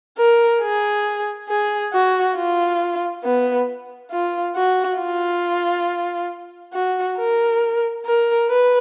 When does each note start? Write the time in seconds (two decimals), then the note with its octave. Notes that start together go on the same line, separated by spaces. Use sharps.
0.18 A#4
0.62 G#4
1.49 G#4
1.93 F#4
2.36 F4
3.24 B3
4.11 F4
4.56 F#4
4.99 F4
6.73 F#4
7.18 A#4
8.05 A#4
8.49 B4